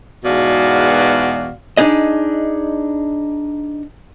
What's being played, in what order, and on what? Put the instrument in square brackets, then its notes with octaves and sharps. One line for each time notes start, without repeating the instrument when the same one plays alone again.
[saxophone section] E2 G#2 B2 F#4 D5 F5
[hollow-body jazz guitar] D4 D#4 G#4 D#5